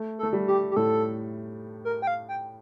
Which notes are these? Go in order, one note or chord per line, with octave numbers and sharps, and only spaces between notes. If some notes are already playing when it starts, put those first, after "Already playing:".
Already playing: A3
A4
A3
G3
G4
G4
A2 A4
A#4
G5
F5
G5